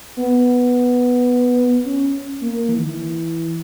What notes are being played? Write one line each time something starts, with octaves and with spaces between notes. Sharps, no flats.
B3
C#4
A#3
E3
D#3
E3